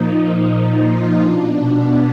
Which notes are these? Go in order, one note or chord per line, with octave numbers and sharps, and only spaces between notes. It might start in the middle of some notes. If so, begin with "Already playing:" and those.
Already playing: A#2 F3 D#4
D#4
F4
B2 D4
B3